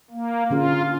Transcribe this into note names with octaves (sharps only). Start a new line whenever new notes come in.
A#3
D3 C#4 F4 G#4